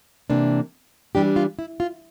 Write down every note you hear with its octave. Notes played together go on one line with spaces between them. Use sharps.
C3 E3 A#3 D4
E3 G3 D4 G4
F4
E4
F4